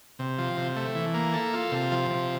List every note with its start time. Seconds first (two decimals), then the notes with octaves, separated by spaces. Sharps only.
0.19 C3
0.38 F3
0.57 C3
0.76 A3
0.95 E3
1.14 A#3
1.33 A4
1.53 F4
1.72 C3
1.92 F3
2.11 C3